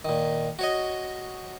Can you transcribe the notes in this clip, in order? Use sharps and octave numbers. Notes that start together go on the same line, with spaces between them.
A#2 D#3
F#4 C#5 D#5